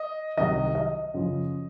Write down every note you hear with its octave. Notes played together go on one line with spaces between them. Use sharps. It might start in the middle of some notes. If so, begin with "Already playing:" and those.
Already playing: D#5
C2 C3 D#3 F#3 D#5
D#5
F#2 C#3 F3